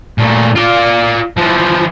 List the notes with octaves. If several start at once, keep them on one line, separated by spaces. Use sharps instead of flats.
A#2 A3
F4 D5
E3 F3